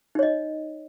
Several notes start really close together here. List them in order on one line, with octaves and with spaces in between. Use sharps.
D#4 C#5 D#5